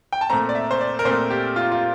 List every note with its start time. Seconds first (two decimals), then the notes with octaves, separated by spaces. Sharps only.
0.13 G5
0.21 A5
0.30 A#2 A3 C4 A#5
0.49 D5
0.55 E5
0.71 C5
0.81 D5
0.99 A#4
1.05 A#2 A3 C4 C5
1.30 G4
1.56 F4
1.72 F4